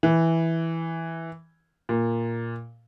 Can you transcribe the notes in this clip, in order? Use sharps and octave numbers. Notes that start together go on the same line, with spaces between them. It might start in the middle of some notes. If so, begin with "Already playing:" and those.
E3
A#2